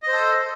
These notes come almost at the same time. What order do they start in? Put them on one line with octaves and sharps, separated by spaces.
D#5 C5 A4